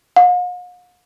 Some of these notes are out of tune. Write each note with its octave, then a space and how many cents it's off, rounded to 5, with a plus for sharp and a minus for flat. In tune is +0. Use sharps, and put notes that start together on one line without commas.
F5 +45